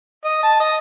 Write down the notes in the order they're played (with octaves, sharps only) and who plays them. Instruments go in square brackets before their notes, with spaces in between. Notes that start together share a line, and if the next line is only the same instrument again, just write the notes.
[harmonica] D#5
A5
D#5